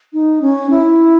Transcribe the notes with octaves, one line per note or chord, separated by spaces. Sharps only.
D#4
C#4
E4